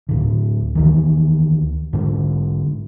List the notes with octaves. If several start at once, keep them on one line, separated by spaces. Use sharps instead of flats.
D2 A2 D3
D2 D#3 E3
G#2 D3